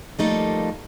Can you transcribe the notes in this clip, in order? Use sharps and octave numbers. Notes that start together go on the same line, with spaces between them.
F3 G3 A3 A#3 D#4 A4